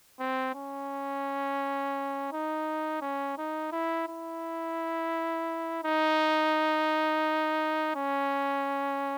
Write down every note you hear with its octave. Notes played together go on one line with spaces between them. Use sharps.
C4
C#4
D#4
C#4
D#4
E4
E4
D#4
C#4